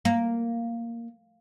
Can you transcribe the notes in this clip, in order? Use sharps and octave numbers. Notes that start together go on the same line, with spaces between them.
A#3